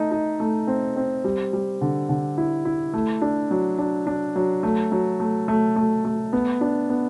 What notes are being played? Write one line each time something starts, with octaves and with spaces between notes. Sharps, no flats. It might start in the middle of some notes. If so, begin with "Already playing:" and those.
Already playing: A3 D#4
D#4
A3
C4
C4
G3
G3
D3
D3
E4
E4
A3
D4
F#3
D4
D4
F#3
A3
F#3
A3
A3
A3
A3
B3
D4
B3